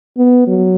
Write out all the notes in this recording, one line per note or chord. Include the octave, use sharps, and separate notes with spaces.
B3
F#3